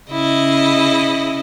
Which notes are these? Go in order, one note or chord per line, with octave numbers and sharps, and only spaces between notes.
C#3 E4 D#5